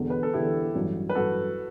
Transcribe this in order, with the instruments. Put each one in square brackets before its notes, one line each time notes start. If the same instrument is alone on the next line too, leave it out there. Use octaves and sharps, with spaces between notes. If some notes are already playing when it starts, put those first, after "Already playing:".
Already playing: [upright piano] E1 E2 D3
[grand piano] B4
A4
[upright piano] E1 E2 D3 [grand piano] E4 G4
[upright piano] A1 G2 F#3
[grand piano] B4
[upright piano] A1 G2 F#3 [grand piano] F#4 A4